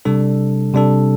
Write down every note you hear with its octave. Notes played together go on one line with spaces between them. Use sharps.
C3 G3 D4 A4
C3 G3 D4 A4